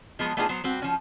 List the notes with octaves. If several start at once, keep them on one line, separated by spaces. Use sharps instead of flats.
F3 F#3 G#3 B3
A3 B3 D4 D#4 F4 G#4
F#3 B3 C5
G3 C4 F#4
F3 C#4